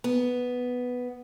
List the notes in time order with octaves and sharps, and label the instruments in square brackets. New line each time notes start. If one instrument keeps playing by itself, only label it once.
[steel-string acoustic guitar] B3